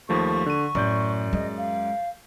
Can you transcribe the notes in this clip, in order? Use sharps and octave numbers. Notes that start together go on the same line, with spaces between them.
D#2 F3 A3 C#6
D3 D#7
F#2 A2 D5 G6
G#3 D#5
F5